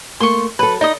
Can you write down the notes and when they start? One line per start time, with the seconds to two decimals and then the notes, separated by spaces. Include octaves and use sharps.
0.20 A3 A#3 C6 C#6
0.59 F#3 A4 B4
0.81 D#4 D5 D#5